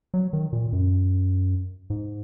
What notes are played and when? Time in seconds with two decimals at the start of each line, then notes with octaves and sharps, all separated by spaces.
0.14 F#3
0.33 D#3
0.53 A#2
0.73 F#2
1.90 G#2